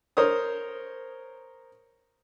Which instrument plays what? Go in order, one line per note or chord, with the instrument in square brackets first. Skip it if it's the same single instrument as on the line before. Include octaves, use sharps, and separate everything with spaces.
[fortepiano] A#4 C5 C#5 D#6